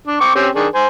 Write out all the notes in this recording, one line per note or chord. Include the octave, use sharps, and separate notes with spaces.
D4
C4 C#6 D6
C4 C#4 G4
D#3 D4 G#4
C5 G#5